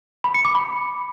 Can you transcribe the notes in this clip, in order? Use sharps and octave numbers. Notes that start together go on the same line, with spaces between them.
B5
C#7
D6
B5